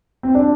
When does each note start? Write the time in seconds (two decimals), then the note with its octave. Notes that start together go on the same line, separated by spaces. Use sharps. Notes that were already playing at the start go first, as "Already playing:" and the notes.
0.23 C4
0.35 D4